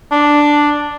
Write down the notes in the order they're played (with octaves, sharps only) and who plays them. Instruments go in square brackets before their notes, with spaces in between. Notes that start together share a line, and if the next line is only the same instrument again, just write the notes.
[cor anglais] D4